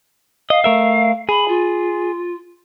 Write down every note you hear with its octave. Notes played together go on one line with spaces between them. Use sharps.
D#5 F5
A3 A#4 E5
G#4 B5
F4